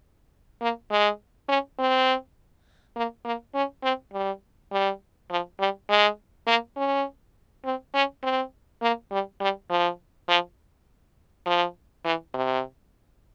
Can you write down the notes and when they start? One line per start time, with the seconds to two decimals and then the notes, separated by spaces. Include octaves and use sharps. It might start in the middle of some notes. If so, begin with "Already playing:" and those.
0.61 A#3
0.91 G#3
1.49 C#4
1.79 C4
2.96 A#3
3.25 A#3
3.55 C#4
3.83 C4
4.13 G3
4.72 G3
5.30 F3
5.59 G3
5.89 G#3
6.47 A#3
6.77 C#4
7.65 C4
7.94 C#4
8.24 C4
8.82 A#3
9.12 G3
9.41 G3
9.70 F3
10.29 F3
11.46 F3
12.05 E3
12.34 C3